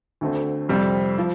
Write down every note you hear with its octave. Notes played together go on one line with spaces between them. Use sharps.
D2 D3 A3 C4
F2 C3 G3 C4
F3